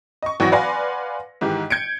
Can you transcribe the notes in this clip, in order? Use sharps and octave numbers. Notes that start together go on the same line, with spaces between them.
D#5 C#6
G#1 E3 F#3 F#5 C#6 A#6
B4 D5 F5 F#5 G#5 C6
G#2 D#3 E3 G4
G6 G#6 C#7 D7